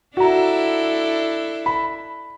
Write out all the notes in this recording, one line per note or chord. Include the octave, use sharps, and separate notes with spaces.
D4 E4 F#4 A4 A#5
B5